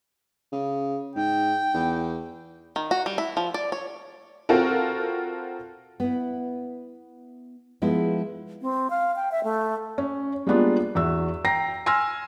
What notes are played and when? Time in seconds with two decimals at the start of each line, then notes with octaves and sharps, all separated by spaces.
0.52 C#3
1.15 G#2 G5
1.74 E2
2.76 D#3
2.91 F#4
3.06 G3
3.18 E4
3.37 F3
3.54 D5
3.72 C#5
4.49 C4 F4 F#4 A4 A#4
6.00 B3 E4
7.82 F3 G#3 B3 E4
8.62 C4
8.90 F5
9.16 G5
9.32 E5
9.44 A3
9.98 C#4
10.47 G3 G#3 A#3 B3 D4 F4
10.95 E2 F#4 E5 E6
11.45 G5 A#5 A#6 C7
11.86 G#5 C6 E6 F6 A#6